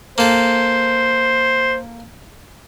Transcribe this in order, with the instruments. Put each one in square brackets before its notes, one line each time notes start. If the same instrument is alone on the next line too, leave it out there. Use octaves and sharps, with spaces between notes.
[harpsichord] A#3 A4 [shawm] C5